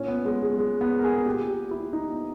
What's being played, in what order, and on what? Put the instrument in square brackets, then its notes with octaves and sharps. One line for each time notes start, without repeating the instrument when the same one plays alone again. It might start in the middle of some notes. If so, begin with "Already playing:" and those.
Already playing: [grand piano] A#2 C#4
B3
G#3
G#3
G#3
B3
A#4
G#4
G#4
A#2 G4
G4
E4
D#4
B3